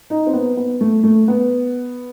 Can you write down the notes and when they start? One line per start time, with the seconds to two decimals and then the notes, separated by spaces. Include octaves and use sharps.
0.10 D#4
0.27 C4
0.34 B3
0.57 B3
0.81 A3
1.04 A3
1.28 B3